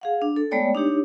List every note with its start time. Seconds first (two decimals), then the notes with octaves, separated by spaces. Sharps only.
0.01 G#4 F5 F#5
0.22 D4
0.36 A4
0.51 G#3 A3 B3 C#5 D5 G5
0.75 D4 D#4 G4 C#5